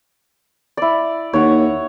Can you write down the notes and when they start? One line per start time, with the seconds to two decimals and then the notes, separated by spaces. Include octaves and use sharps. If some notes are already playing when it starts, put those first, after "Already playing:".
0.77 E4 D5
1.33 D#2 C#5 F#5